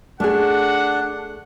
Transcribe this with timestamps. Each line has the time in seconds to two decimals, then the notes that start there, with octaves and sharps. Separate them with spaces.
0.20 A3 D4 G#4 F#5